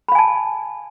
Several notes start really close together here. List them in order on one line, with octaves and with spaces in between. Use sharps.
B5 F5 G#5 A5